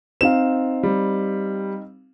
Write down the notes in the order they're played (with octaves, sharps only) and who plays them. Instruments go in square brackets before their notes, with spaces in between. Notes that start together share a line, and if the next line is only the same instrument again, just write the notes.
[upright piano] C4 D#4 F5 [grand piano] E7
[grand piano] G3